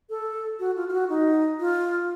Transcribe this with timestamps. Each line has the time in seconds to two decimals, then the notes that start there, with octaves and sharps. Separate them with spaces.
0.10 A4
0.60 F#4
0.76 F4
0.88 F4
0.93 F#4
1.09 D#4
1.60 F4